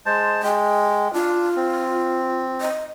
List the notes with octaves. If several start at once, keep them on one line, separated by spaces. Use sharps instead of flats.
G#3 C5 A5
G#3 G5
D4 F4
C4
D#5